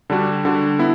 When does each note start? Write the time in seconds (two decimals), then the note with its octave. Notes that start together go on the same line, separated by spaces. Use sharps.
0.10 D3 G3 D4 F#4
0.45 D3 G3 D4 F#4
0.79 B3 E4